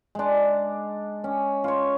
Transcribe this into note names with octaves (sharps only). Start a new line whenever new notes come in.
G#3 D4
C#4
F4 C#5